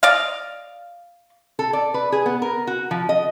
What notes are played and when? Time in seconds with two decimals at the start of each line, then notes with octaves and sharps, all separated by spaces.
0.03 D5 D#5 F5
1.59 A4
1.73 D5
1.94 B4
2.12 G#4
2.26 B3
2.42 A#4
2.67 F#4
2.91 F3
3.09 D#5